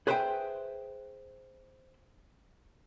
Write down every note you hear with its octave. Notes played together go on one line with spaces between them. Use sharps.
G#4 B4 C5 E5 F5 G5